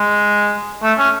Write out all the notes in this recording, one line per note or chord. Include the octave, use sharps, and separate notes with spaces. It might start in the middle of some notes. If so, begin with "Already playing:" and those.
Already playing: G#3
A3
C#4